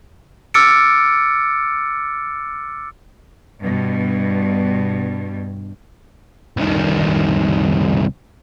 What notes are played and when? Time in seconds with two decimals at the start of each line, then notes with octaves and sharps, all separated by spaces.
0.54 D6 E6 F6 A6 C#7 D7
3.60 G2 B2
6.57 C2 D#3